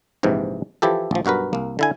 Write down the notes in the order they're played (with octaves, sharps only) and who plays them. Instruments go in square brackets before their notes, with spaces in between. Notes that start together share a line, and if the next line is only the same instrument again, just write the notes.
[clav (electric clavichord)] A#1 G#2 C3 E3
E3 F3 E4 G4 A4
A1 F3
B1 G2 F#4 A#4 B4
C2 A#3
D3 E4 G#5